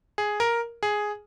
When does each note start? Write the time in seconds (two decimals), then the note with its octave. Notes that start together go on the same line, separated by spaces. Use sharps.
0.18 G#4
0.40 A#4
0.83 G#4